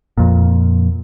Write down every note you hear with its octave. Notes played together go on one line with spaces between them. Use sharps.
F2 A#2